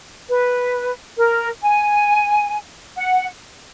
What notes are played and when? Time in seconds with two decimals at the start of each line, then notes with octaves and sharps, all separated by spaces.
0.29 B4
1.18 A#4
1.63 G#5
2.96 F#5